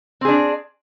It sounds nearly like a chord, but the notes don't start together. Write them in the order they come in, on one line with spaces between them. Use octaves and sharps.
C4 G#4 D4